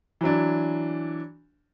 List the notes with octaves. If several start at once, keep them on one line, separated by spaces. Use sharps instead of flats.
E3 F#3 D4